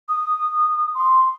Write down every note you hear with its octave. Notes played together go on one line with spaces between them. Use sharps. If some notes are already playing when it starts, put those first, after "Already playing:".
D#6
C6